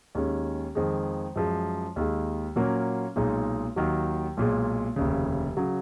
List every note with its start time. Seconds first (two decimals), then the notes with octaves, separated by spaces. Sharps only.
0.15 D#2 D#3 G#3 C#4
0.75 F2 D#3 G#3
1.36 F#2 F3 G#3
1.96 D#2 D#3 G#3
2.56 A#2 F#3 A#3 C#4
3.16 B1 A#2 G#3 D#4
3.76 D#2 D#3 F#3
4.37 B1 A#2 G#3
4.96 F1 D#2 C#3
5.57 C#3 F#3